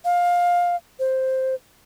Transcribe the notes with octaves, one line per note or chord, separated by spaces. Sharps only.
F5
C5